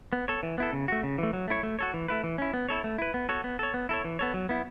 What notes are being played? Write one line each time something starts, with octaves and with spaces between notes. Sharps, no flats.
B3
A4 C#5
E3
B3 E4 A4
C#3
A3 F#4
C#3
E3 A3
F#3
A3 E4 C#5
A3
F#4 A4 C#5
E3
A3 E4 B4
E3
C#4 E4
B3
E4 A4 C#5
A3
E4 B4
B3
F#4 A4 C#5
B3
A4 C#5
B3
E4 A4 C#5
E3
B3 A4 C#5
F#3
B3 E4